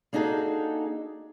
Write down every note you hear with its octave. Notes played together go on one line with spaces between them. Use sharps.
A#3 D4 D#4 F#4 G#4 A4